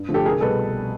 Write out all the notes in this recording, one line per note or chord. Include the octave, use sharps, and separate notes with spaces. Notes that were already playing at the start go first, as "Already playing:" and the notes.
Already playing: G2
D3 F3 A3
G4 A4
C2 G#4 A#4
B2 G3 A4 B4